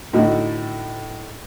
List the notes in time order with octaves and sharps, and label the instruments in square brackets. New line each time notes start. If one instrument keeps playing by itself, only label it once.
[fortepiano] A2 D3 A3 D#4 F#4